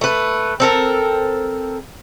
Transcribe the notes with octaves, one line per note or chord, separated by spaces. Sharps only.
A3 B4
C4 A4 A#4